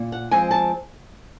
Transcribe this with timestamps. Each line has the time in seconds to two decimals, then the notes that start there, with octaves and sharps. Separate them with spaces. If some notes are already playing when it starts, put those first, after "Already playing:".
Already playing: A#2
0.12 F#5
0.31 F3 G#3 C4 G#5
0.51 A5